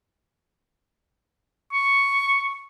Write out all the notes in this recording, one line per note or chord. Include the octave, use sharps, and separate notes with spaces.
C#6